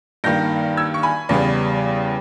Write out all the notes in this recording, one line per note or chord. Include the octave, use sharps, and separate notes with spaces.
G2 D#3 A#3 G6 A#6
E6 G#6
C#6
G#5 B5
E2 C#3 G3 B3